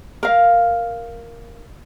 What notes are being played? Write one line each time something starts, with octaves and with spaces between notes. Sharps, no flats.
A#4 F5